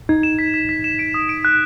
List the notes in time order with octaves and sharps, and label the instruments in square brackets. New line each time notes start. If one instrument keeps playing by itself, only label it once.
[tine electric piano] D#4 [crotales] G#6
[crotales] E7
B6
B6
B6
E7
D7
D#6
D7
F#6